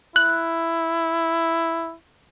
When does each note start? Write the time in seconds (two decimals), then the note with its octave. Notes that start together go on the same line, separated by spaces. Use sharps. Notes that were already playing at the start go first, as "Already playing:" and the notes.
0.16 E4 F#6